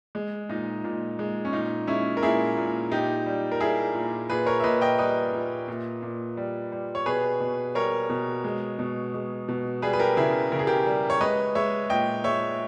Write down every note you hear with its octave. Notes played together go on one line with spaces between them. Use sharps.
G#3
A#2 D#4
A#2
G#3
C#4
A#2 D#4
G#3 C#4 E4
A#4
A#2 E4 G#4
A#2
A#2 D#4 G4
G3
A#4
G3 E4 G#4
A#2
A#2 G#4 B4
A#4 C#5
E5
A#2 B4 D#5
D#5 G5
G3 B4 D#5
A#2
A#2
A#2
G3
G3
C#5
B2 G#4 B4
B2
G3 A#4 C#5
B2
G#3
B2
G#3
B2
G3 G#4 B4
B4
G4 A#4
C#3 E4 G#4
C#3 A#4
G#4
G4 A#4
G3
C#5
G#3 B4 D#5
G#3 C#5 E5
A#2 D#5 G5
G#3 C#5 E5